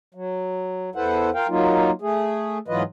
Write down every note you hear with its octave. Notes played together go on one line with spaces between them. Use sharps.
F#3
E2 E4 A4 B4 C5 F#5
F4 A#4 F5 G5
F#3 A#3 D#4 F4
A3 G#4
G#2 E3 F#3 F4 B4 D#5